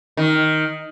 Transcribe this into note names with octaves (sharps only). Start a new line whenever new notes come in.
D#3